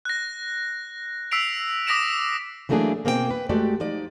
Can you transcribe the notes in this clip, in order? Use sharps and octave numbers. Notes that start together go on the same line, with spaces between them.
F#6 A#6
E6 B6 C7 D7 F7
D6 D#6 A#6 B6 D7 E7
E3 F#3 A3 A#3 D4 G#4
B2 A#3 C4 G#4 A4 G5
B4
G#3 A3 F#4 G4 D5
F3 D#4 D5